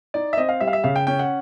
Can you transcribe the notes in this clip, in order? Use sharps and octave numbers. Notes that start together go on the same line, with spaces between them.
D#4 D5
E5
C4 D#5
F5
G3 E5
F5
E5
C#3 F5
G5
C#4 G5
F#5